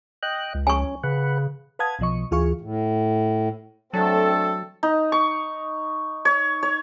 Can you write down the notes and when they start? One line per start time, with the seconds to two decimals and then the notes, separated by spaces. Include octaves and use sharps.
0.23 D#5 G5 F#6
0.54 C#2
0.67 C#4 G#5 C#6
1.04 C#3 B4 F#5
1.79 B4 F5 F#5 A5 D#6 G#6
1.99 B1 B2 F3 D#5 C#6
2.31 D2 E3 F4 G#4 F5 C#6
2.61 A2
3.94 F#3 A3 C4 D4 A4 A5
4.83 D#4
5.12 C#6
6.25 C#5
6.63 C#5